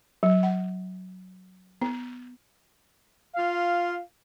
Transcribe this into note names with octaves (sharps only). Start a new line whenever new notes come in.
F#3
F#5
B3
F4 F5